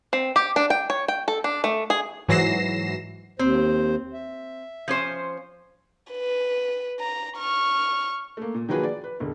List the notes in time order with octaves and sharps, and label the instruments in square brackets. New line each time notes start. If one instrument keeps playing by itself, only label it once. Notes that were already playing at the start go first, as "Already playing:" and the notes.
[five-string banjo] C4
G4
D4
G5
C#5
G5
A4
D4
A3
G#4
[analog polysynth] G#2 E3 F#3 A#6 C7 E7
[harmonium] D#2 C5 [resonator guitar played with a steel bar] C4
[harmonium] E5
[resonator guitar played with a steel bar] F3 C#4 C5
[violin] B4
A#5
C#6 F6
[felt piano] A3 A#3
A#2
D#3 F3 F#3 A#3 G#4 B4
D5
B4
E1 D3